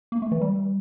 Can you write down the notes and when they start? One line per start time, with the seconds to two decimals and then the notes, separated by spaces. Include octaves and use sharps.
0.12 A#3
0.22 A3
0.32 E3
0.41 G3